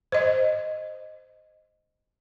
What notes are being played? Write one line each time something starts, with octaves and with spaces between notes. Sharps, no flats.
C5 D#5